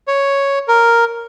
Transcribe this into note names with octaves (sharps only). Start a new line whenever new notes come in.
C#5
A#4